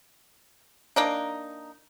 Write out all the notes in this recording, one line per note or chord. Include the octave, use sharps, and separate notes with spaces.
A#3 D4 D#4